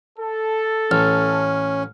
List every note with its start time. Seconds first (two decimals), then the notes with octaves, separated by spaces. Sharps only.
0.18 A4
0.91 A1 C#4 F6